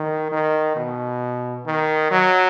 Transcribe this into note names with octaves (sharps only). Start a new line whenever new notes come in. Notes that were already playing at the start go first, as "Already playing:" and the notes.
Already playing: D#3
D#3
B2
D#3
F#3